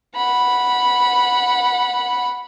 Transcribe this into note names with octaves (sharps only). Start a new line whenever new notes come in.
F#5 B5